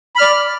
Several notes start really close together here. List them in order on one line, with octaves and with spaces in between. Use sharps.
B5 F6 D5